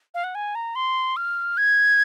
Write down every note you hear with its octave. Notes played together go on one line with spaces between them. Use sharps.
F5
F#5
G#5
A#5
C6
F6
G#6